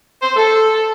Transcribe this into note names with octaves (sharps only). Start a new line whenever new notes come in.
C5
A4